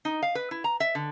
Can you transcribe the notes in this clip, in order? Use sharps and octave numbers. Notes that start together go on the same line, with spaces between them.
D#4
F5
B4
E4
A#5
E5
D3